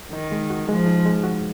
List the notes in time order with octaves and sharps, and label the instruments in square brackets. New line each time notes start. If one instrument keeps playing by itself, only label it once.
[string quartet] D#3 [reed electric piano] D#4
[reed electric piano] G#3
F#4
[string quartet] F3 [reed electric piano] G#3
[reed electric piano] D#4
G#3
F#4